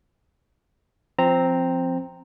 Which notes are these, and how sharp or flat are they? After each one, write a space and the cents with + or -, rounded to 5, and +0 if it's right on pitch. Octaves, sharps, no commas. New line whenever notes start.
F3 +0 C4 +0 A#5 -10